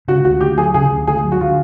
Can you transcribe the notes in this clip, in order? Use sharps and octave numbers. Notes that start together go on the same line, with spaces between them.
C#3 F#4
D2 F#4
D2 G4
F#3 G#4
C#3 G#4
D2
D2 G#4
F#3
F#4
D3 F4